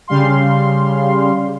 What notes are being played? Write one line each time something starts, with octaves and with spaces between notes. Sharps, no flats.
C#3 G3 F5 C6